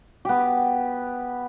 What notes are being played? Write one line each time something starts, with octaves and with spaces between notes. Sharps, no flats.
B3 G4